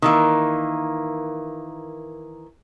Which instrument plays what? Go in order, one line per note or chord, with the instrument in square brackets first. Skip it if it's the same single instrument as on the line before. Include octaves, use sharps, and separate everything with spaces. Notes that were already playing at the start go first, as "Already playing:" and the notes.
[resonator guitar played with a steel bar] D#3 E3 A#3